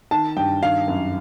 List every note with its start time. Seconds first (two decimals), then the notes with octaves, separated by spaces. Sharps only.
0.11 D#3 A5
0.36 G2 G5
0.62 D#3 F5
0.88 F#2